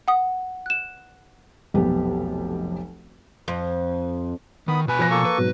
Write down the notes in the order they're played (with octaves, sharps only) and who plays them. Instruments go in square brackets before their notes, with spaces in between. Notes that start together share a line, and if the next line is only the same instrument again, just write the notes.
[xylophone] F#5 D#6
F#6 E7
[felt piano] F1 B1 B3 G4
[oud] F2
[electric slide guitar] D#3 [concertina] B3 B5 D#6
[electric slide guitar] B2 G#5 [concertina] B4
[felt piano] F3 F#6 A#6
[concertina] A#3 A4 C#6
[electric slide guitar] B4
[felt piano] G#2 B2 F#3